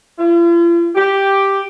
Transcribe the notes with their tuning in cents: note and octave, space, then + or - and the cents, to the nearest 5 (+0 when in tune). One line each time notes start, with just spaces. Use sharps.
F4 -45
G4 +0